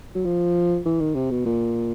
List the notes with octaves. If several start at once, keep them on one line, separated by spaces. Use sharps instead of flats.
F#3
F3
E3
D#3
C3
B2
A#2